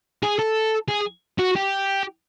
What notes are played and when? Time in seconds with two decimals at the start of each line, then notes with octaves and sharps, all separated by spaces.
0.23 G#4
0.39 A4
0.89 G#4
1.39 F#4
1.56 G4